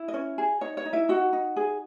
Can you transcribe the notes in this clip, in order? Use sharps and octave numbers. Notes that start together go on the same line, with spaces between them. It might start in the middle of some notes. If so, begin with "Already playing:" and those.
Already playing: E4
D#5
C#4 C#5
G#4
D#4 C#5
C#5
D#4
E4 E5
D#4 F#4 F#5
D#4
G#4